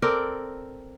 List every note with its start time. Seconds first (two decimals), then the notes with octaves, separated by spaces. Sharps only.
0.02 C4 A4 A#4 D5